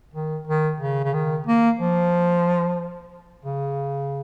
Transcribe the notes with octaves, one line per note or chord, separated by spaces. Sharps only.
D#3
D#3
C#3
C#3
D#3
A#3
F3
C#3